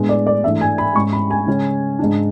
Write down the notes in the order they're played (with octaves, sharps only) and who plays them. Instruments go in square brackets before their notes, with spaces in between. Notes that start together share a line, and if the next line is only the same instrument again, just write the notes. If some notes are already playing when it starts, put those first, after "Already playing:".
Already playing: [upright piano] A2 G#3 B3 D4
D5
D5
G#2 E3 A3 D4 E5
G#5
B5
G#2 G#3 C#4 C#6
B5
G#5
C#3 G#3 C#4
G#2 G#3 D4